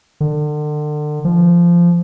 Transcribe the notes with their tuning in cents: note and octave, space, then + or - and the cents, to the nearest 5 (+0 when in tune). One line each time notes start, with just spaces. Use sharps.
D3 +35
F3 -15